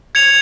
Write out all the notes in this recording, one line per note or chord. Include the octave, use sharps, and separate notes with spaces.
G#6 C#7 F7